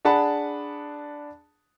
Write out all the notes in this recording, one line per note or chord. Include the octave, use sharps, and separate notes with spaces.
D4 G#4 F#5 A5 B5